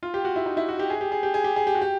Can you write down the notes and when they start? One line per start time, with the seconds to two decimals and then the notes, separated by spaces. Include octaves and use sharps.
0.03 F4
0.14 G4
0.25 F#4
0.36 E4
0.46 D#4
0.57 E4
0.69 F#4
0.79 G4
0.90 G#4
1.01 G4
1.12 G#4
1.23 G4
1.34 G#4
1.44 G4
1.56 G#4
1.67 G4
1.75 F#4
1.82 G4